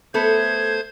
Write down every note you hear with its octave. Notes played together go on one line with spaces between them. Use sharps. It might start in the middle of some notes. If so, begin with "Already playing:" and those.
A3 B3 A4 C5 G#6